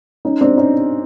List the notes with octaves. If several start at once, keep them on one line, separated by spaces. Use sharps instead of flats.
C#4 D#4
C4 D4
C#4 D#4